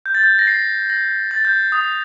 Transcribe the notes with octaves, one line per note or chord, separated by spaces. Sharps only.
G6
A6
G6
A#6
C7
A#6
A6
G6
D#6